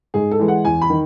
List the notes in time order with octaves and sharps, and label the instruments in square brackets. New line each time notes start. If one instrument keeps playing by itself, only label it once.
[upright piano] G#2 G#4
A4
E3 G#3
F#5
E2 G#5
B5
D#3